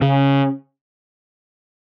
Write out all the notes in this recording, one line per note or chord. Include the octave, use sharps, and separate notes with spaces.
C#3